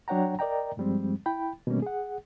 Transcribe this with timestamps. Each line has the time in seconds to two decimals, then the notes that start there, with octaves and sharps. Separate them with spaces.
0.08 F#3 D4 C#5 F#5 G5 A#5
0.39 A#4 D5 D#5 G5 A#5
0.77 G2 F3 G3 G#3 C4
1.26 E4 G5 B5
1.67 B2 D#3 G3 A3 A#3 C#4
1.82 G#4 F#5